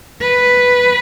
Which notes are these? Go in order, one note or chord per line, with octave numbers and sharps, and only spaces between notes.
B4